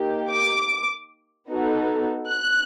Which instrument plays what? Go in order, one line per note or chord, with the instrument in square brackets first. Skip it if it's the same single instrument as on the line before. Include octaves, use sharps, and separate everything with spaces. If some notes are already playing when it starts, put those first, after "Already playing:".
Already playing: [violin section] A#3 D#4 G4
D6
B3 D#4 F#4 A4
F#6